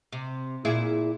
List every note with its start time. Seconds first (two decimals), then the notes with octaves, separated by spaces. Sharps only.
0.12 C3
0.65 A#2 E4 G#4